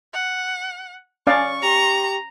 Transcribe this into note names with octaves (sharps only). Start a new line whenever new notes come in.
F#5
C#4 D5 F5 C#6
G4 A#5